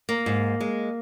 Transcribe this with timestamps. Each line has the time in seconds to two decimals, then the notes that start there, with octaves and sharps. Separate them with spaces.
0.09 A#3
0.26 G#2
0.61 G#3